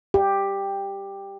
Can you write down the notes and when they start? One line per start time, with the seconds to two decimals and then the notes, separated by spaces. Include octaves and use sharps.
0.14 G4